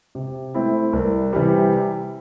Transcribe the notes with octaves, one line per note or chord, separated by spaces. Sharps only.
C3
A3 C4 E4
C2
C3 E3 G3